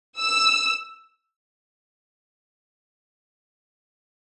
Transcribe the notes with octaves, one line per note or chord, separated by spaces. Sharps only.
E6